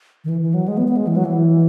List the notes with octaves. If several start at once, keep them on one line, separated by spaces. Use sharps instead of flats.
D#3
E3
E3
F#3
G#3
B3
B3
G#3
E3
F#3
E3